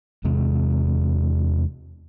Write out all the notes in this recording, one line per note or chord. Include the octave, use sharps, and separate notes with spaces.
E2 C3 G#3